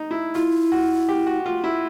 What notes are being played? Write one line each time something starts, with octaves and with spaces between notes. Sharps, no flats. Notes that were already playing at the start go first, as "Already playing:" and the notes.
Already playing: D#4
E4
E4 F4
F#4
G4
F#4
F4
E4